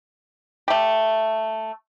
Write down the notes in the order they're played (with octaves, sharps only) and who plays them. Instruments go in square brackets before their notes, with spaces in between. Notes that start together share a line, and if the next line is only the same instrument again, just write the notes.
[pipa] A3 G4